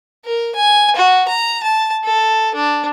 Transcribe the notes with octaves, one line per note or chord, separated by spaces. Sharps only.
A#4
G#5
F#4
A#5
A5
A4
D4